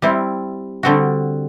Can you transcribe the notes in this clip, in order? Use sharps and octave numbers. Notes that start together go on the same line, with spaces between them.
G3 C4 E4
D3 G3 C4 F#4